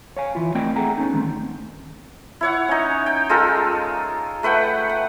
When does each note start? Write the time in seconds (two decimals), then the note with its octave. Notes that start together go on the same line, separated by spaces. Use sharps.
0.17 C#5 F5 G#5
0.35 E3 E4 F4
0.55 A3 C4 A#4 D5 D#5 G5
0.76 G#4 A4 E5 F#5 G#5 A#5
0.98 B3 C#4 D#4
1.12 D3 D#3 F#3 A3 C4
2.41 E4 C#5 F#5
2.68 C#4 D#4
3.06 G5
3.29 G#3 F4 A4 A#4
4.43 A3 B4 F#5 G5
4.89 F#5